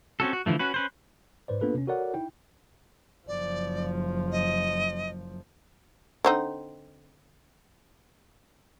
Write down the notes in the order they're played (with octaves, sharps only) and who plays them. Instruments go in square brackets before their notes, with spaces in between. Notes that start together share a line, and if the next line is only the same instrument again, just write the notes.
[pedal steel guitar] C4 C#4 F#4 A4
F#4
D3 E3 F3 A3
C#4 F#4 B4
C#4 B4 C5
[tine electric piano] G#2 B4 C5 D5
A#3 B3 D4 F4 A4 B4
C3 C#4
F#4 A4 A#4 C#5 D5 F#5
D#4 E4 G5
[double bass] F#1 F3 [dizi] D5
[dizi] D#5
[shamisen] D3 C4 D#4